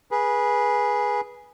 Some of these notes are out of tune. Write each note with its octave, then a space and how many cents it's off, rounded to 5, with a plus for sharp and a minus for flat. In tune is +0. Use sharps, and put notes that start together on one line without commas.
G#4 +0 B4 -20